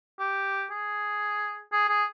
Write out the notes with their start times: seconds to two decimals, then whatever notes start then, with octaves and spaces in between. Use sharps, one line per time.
0.19 G4
0.70 G#4
1.72 G#4
1.89 G#4